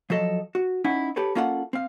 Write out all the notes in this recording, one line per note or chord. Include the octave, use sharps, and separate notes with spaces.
F3 F#3 A4 D#5
F#4
C#4 D#4 E4 F#5
G4 A4 B4 C#5
A#3 C#4 F4 A4 F5 F#5
C4 F5